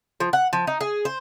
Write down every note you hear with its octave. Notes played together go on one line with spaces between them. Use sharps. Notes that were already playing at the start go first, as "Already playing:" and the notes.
F3
F#5
F3
D#4
G#4
C5